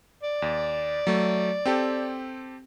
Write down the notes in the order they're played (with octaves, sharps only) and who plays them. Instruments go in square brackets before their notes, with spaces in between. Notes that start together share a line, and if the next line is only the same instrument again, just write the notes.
[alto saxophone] D5
[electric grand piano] D#2
F#3 A3
C4 G4 A4